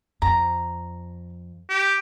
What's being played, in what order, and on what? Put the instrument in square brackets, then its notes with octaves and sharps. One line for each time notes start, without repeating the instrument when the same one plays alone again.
[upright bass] F2 [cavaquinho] A#5
[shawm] G4